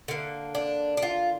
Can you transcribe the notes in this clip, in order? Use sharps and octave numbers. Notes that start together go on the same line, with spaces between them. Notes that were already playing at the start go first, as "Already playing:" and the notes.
D3 A#3
D4
D4
F4